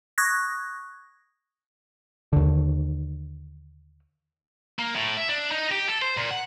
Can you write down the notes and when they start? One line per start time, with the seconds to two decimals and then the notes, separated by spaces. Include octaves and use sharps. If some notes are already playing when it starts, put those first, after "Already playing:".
0.18 C#6 D#6 F#6 G#6 A#6
2.33 D#2 D3
4.79 A#3
4.95 A2
5.17 E5
5.29 D4
5.52 D#4
5.72 G4
5.89 A4
6.02 C5
6.17 A#2
6.31 F#5